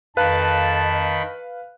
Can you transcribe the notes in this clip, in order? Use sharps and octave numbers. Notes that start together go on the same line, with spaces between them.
F2 D#3 B4 F5 A5 B5 F#6